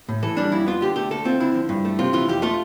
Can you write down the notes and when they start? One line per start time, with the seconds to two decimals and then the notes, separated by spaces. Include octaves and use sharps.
0.09 A2
0.23 E3 A4
0.37 G3 D4
0.52 F2 E4
0.66 B3 F4
0.81 D3 G4
0.96 A3 G4
1.10 D2 A4
1.25 C4 F4
1.40 D3 E4
1.54 F3
1.69 G2
1.85 A3
1.99 C3 F4
2.13 E3 F4
2.28 F2 G4
2.42 A3 F4